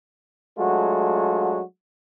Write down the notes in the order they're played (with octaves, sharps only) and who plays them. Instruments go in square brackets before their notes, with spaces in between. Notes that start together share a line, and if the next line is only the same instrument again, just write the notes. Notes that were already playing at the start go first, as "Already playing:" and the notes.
[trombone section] F#3 G#3 A3 D4 F4 F#4